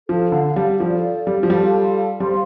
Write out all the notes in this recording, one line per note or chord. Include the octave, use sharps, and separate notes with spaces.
F3 A4 F5 A5
D3
G3
F3 A4 D5 F5
G3
F3
G3 F4 A4 F5 A5
G3 C5 F5 C6